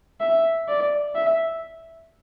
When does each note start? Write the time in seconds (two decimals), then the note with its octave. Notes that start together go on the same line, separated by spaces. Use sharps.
0.21 E5
0.68 D5
1.15 E5